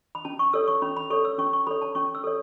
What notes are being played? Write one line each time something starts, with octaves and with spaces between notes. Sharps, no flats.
B5
C#4 A5
C#6
A4 C#5 E6
C#6
C#4 B5
B5
A4 C#5 C#6
E6
C#4 C#6
C#6
A4 C#5 B5
A5
C#4 C#6
E6
A4 C#5